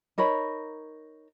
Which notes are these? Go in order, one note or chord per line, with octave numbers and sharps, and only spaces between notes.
D#4 A#4 C#5 B5